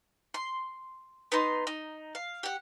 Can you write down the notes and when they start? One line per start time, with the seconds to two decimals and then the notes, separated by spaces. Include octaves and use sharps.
0.34 C6
1.32 B3 D#4 C6
1.67 D#4
2.15 F5
2.43 G4 F#5